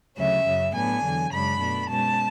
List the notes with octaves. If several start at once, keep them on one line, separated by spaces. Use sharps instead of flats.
D2 C#3 F#3 C#4 E5
F#2 C#3 F#3
A2 F#3 B3 D4 G#5
E2 D3 F#3
F#2 C#3 G#3 D4 B5
B2 A3 D4
B2 G#3 C#4 A5